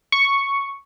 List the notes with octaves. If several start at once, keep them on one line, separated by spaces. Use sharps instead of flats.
C#6